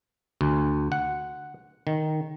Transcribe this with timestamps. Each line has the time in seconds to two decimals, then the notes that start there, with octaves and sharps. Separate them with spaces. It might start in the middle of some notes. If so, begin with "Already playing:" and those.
0.41 D2
0.92 F#5
1.87 D#3